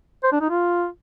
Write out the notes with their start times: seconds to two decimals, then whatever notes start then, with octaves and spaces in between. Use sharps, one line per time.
0.24 C5
0.32 D4
0.41 D#4
0.49 F4